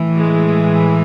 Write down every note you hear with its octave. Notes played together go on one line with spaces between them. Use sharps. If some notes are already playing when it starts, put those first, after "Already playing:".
Already playing: A2 E3
G#3